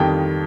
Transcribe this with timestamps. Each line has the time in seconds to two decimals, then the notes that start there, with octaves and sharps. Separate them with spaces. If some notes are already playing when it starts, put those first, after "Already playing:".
Already playing: F2 D#3 G3 G5